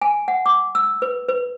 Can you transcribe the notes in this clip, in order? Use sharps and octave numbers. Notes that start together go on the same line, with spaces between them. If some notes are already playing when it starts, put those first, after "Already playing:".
G#5
F#5
D6
E6
B4
B4